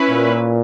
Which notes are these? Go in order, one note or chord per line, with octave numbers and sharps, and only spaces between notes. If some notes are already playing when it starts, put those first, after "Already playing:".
Already playing: C#4 E4 B4
A#2